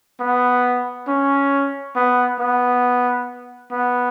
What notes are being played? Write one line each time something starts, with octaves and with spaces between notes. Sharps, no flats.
B3
C#4
B3
B3
B3